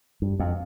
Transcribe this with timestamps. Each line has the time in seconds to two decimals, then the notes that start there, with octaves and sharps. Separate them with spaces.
0.22 G2
0.40 F2